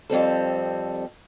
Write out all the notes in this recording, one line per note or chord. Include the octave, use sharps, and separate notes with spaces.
F2 G3 C4 A4